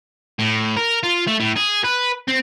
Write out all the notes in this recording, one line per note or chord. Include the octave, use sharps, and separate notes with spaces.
A2
A#4
F4
A3
A2
G#4
B4
C4